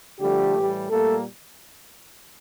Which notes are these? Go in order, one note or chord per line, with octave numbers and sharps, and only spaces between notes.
D3 F3 G3 A3 G4
A2 E3 G3
A#2 G3 A3 A#3 A4